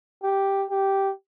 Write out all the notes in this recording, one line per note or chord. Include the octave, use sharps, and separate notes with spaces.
G4
G4